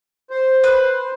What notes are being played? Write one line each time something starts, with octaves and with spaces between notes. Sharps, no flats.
C5
B4